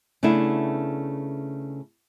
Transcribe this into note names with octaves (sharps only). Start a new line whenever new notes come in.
C#3 A3 B3 D4 E4